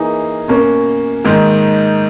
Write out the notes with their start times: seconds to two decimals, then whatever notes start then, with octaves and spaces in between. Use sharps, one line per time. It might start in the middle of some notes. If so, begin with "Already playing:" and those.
Already playing: E3 A#3 D#4 G#4
0.48 B2 A#3 C#4
1.24 G#2 D#3 A#3